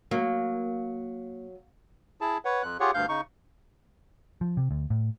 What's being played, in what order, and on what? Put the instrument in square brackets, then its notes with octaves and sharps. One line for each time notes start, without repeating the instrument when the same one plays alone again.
[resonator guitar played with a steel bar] F#3 [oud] A#3
[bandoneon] E4 G#4 A5
B4 C#5 F#5
F2 F#6
F4 G4 G#4 C#5 F#5
D2 G2 F5 G6
C#3 D#4 C#6
[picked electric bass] F3
C3
D2
A2